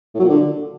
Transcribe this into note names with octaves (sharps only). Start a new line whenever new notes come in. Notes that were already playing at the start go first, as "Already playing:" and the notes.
A2
F#3
A#2
D3